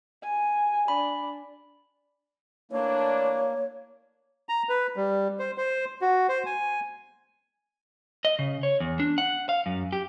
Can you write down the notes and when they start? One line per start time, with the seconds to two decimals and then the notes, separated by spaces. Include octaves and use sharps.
0.22 G#5
0.88 D4 B5
2.71 E3 A3 A#3 D4 C#5
4.49 A#5
4.69 B4
4.96 G3
5.39 C5
5.57 C5
6.01 F#4
6.29 C5
6.46 G#5
8.25 D#5
8.39 C#3
8.63 C#5
8.80 E2
9.00 D4
9.18 F#5
9.49 F5
9.66 F#2
9.93 G4